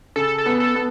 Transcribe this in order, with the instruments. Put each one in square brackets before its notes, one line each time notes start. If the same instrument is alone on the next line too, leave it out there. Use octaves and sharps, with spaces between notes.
[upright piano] C#3 [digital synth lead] A4
[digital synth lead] A4
[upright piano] B3
[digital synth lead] A4
[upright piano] B3